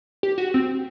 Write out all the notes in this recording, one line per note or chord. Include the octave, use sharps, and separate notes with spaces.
G4
F#4
C4